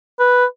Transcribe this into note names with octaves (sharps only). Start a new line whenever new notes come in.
B4